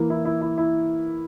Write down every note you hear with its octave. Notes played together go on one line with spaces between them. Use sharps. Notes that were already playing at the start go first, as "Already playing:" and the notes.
Already playing: E3 A#3
E4
E4
E4
E4